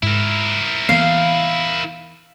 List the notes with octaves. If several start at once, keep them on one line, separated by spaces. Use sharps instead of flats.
G#2 E4 A#4
E3 A#3 B3 F5